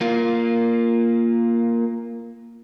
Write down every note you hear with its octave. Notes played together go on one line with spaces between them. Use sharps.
A#3 F4